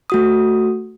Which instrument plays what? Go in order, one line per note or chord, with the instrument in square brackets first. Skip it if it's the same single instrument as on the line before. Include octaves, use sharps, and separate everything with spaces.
[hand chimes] A3 F#4 D#6